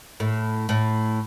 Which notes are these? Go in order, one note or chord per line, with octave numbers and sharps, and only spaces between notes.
A2
A2